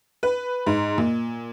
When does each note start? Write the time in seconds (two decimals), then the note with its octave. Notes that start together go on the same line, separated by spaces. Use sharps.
0.23 B4
0.66 G#2
0.98 A#2